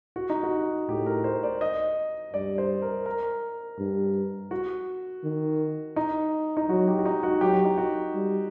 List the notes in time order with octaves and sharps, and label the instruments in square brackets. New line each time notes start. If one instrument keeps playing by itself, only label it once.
[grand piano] F#4
D#4
F#4
[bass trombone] A2 [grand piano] G4
[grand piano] A#4
C5
D5
D#5
[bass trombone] G2 [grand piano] D5
[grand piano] C5
A#4
A#4
[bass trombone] G2
[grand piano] F#4
[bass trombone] D#3
[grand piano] D#4
D#4
[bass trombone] F#3 [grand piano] F#4
[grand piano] G4
F#4
D#4
F#4
[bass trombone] F#3 [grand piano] G4
[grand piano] F#4
D#4
F#4
[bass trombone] G3